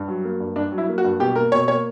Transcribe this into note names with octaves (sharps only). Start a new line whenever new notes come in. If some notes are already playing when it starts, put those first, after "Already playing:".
Already playing: G2
F#3
A#3
G2
G2 D4
F#3
E4
A#3
F#4
G2
B2 G4
A#3 A#4
B2 C#5
A#3 C#5